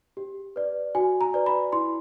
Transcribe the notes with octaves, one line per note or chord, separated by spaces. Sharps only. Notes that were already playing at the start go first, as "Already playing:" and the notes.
G4
B4 D5
F#4 G#5
A#5
B4 D5
B5
E4 C6